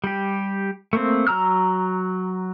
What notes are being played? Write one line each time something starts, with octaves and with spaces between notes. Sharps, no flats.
G3 G4
A3 A#3 C4
F#3 A#5 E6 F6